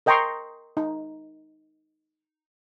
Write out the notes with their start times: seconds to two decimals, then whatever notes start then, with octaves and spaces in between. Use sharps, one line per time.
0.06 A#4 D#5 G5 A#5 C6 C#6
0.77 D#4